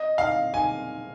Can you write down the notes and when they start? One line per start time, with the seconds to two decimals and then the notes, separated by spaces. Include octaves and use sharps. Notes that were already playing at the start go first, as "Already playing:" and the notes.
Already playing: D#5
0.18 F5
0.54 G#5